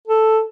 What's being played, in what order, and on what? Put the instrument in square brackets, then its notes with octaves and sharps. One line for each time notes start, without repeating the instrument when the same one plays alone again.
[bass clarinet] A4